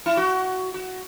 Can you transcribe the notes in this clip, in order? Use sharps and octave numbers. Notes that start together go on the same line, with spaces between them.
E4
F#4
F#4